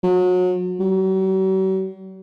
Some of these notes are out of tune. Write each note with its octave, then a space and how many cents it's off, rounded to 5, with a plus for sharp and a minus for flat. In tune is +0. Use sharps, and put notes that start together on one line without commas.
F#3 -30
F#3 +45